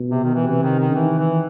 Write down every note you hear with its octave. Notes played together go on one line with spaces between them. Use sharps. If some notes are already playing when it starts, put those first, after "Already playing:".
Already playing: B2
C3
D#3
E3
C3 E3
D#3
D#3
D#3 E3
E3